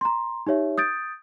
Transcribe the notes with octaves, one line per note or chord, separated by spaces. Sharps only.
A#5 C6
D#4 G4 C#5 E5
D#6 G6 A6 D7